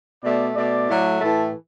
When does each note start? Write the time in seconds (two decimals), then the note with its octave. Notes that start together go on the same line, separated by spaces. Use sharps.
0.22 B2 A3 D5
0.55 B2 A3 D5
0.87 A2 F#3 A3
1.19 A2 E3 A3 A5